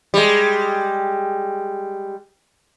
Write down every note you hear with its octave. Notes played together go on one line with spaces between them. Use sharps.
G3 G#3